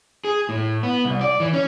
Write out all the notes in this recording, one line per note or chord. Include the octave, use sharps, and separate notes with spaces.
G#4
A2
B3
C2
D5
E3
C#4